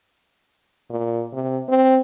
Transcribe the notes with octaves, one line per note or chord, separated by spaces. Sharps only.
A#2
C3
C4